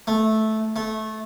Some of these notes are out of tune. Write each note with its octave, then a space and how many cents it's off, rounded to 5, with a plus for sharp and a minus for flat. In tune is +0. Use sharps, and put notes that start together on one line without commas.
A3 -10
A3 -15